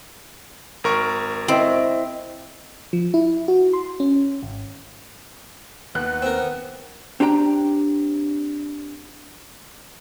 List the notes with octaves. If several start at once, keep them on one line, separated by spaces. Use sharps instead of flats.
G#1 A#4 C#6
C4 E4 D#5 E5
F3
E4
F#4
C6
C#4
G#1
D#2 B3 F#6
C4 A#4
C4 D4 G4 G5 A#5